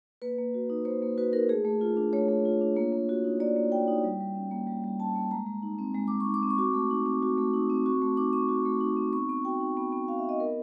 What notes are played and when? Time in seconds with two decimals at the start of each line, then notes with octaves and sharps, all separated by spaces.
0.22 A#3 B4
0.38 A#3
0.54 F#4
0.70 D#4
0.85 A#3 C5
1.02 A#3
1.18 F#4 B4
1.33 D#4 A#4
1.49 A3 G#4
1.65 A3
1.81 F4
1.97 D4
2.13 A3 C#5
2.29 A3
2.45 F4
2.61 D4
2.76 A#3
2.92 A#3
3.09 F#4
3.24 D#4
3.40 A#3 D5
3.56 A#3
3.72 F#4 G5
3.88 D#4
4.04 G3
4.20 G3
4.35 C#4
4.51 A#3
4.67 G3
4.84 G3
5.00 C#4 A5
5.16 A#3
5.31 G#3 A#5
5.47 G#3
5.63 D#4
5.79 C4
5.94 G#3
6.08 G#3 D6
6.20 C#6
6.26 D#4
6.34 D6
6.43 C4
6.50 C#6
6.58 F#4 D6
6.74 A3
6.91 D#4
7.06 C4
7.23 F#4
7.38 A3
7.54 D#4
7.70 C4
7.86 F#4 C#6
8.02 A3
8.17 D#4 D6
8.33 C4 C#6
8.49 F#4
8.65 A3
8.81 D#4
8.97 C4
9.13 B3 C#6
9.29 B3 C#6
9.45 F#4 G5
9.61 D#4
9.77 B3
9.92 B3
10.08 F#4 F5
10.19 E5
10.24 D#4 D#5
10.39 B3 A#4